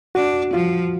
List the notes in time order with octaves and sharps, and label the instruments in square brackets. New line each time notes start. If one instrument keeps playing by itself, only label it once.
[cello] D4 [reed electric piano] F#4
[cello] F3 [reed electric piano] F4